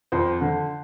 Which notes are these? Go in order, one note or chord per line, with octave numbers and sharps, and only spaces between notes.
F2 C5
D3